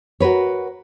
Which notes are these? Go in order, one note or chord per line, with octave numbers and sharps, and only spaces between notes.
F#4 A#4 B4 C#5